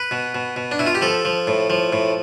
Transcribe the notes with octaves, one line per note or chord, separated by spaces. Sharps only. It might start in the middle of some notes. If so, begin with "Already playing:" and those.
Already playing: B4
B2
B2
B2
D4
B2 E4
F4
G4
F3 A4
F3
A2
F3
A2